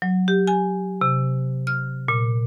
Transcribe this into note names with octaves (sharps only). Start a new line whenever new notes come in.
F#3
G4
G#5
C3
F6
A#2